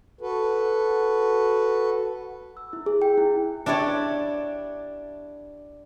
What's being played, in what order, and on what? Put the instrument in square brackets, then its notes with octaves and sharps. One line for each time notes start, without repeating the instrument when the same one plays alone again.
[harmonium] F#4 A4 B4
[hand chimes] E6
E4
G#4
G5
E4
[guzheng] D4 E4 G4 C#5 D5